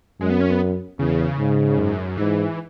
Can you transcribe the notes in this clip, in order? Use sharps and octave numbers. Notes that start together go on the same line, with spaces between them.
F#2 G#3
B3
C#4
B3
E2 C#3
G#2
F#2
G#2 E3